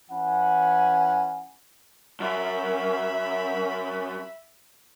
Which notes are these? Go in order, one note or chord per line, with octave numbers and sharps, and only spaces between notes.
E3 C#4 F#5 G#5 B5
F#2 E5 B5